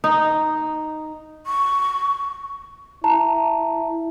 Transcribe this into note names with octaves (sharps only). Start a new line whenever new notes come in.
D#4
C#6
E4 A5 A#5